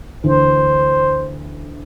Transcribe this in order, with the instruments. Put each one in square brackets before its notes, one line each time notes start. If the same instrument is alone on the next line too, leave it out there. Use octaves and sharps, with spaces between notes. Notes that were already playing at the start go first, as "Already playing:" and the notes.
[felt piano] D2 D3 E3 [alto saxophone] C5